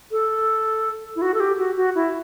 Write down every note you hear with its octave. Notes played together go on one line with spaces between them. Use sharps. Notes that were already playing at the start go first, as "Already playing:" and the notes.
A4
E4
F#4
A4
G4
F#4
F#4
E4